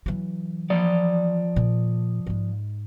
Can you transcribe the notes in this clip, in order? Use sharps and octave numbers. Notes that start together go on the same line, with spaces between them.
E3 F#3
F3 D5
A#2
G#2 G#3